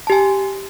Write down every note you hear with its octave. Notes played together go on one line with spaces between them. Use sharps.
G4 G#5 A5